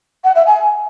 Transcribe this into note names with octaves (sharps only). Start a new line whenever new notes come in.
F#5
E5
G#5